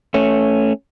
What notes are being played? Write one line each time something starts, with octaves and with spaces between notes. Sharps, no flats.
A3 C#4